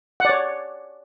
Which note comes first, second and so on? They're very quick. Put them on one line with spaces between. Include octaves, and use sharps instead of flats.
F#5 D5 C#5